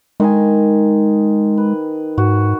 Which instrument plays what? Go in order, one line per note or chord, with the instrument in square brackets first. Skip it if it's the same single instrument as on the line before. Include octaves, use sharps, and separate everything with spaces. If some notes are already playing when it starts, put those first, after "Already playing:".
[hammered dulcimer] D#3 D#4 G#5 [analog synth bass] G#3
[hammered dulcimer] B4
[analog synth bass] G#2 [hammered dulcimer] F#4